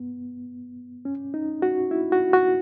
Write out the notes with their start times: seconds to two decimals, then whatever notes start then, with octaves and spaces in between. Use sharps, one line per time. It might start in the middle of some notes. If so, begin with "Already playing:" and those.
Already playing: B3
1.05 C#4
1.34 D#4
1.62 F#4
1.91 E4
2.12 F#4
2.33 F#4